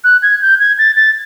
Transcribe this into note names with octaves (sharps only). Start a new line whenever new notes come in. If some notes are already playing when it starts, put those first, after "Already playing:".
F#6
G#6
G6
G#6
A6
A6